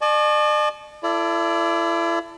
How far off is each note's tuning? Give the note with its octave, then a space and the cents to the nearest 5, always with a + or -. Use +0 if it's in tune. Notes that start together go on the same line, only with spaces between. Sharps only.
D5 +45 A5 -35 C#6 +0
E4 +35 A4 +5 D5 +0